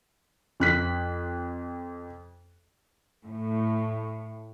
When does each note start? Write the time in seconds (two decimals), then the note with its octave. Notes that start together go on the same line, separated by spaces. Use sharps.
0.60 F2 F#6 B6
3.25 A2